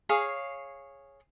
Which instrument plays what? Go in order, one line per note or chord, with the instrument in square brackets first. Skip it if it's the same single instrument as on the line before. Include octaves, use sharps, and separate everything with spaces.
[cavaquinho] G#4 C#5 F5